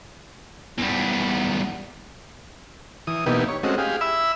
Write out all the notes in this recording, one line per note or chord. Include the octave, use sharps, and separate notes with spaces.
E2 G3
E3 D#6
B2 E3 A#3 B3 D#4 G4
C#5
G#3 A3 C4 C#4 F#4 D#5
G4 G#4 F5
E5 B5 E6